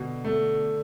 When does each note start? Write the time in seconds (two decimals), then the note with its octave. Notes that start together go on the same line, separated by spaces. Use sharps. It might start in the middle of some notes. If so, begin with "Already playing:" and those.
Already playing: B2 D3
0.25 A3